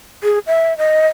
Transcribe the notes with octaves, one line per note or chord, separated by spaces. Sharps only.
G#4
E5
D#5